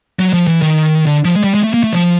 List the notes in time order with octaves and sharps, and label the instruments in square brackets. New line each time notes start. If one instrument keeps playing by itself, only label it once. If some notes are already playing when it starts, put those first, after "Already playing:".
[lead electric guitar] F#3
F3
E3
D#3
D3
F3
G#3
G3
G#3
A3
A#3
A3
F3